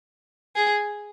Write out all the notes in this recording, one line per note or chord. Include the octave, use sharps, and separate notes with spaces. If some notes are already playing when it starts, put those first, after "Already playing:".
G#4